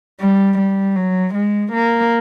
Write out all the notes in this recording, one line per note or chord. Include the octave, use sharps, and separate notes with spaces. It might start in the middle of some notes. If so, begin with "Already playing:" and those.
G3
G3
F#3
G#3
A#3